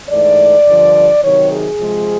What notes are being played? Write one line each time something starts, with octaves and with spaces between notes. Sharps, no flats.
G#2 E3 A3 D5
G2 D3 F3
C3 D#3 F#3 C#5
G#4
C3 F3 G#3